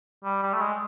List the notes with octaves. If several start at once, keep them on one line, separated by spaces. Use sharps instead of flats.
G3
G3
A3
G#3